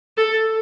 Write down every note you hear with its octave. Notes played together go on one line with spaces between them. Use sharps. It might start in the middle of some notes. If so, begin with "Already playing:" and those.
A4